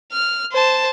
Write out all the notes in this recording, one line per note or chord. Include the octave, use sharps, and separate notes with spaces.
F6
C5 A5